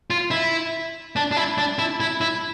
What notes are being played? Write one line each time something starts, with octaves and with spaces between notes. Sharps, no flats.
F4
E4
D4
D4
E4
D4
E4
E4
E4